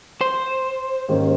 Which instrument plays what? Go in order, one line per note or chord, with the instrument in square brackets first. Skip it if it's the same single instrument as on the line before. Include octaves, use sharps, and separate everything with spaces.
[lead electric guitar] C5
[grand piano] G#2 D#3 G3 A#3 C#4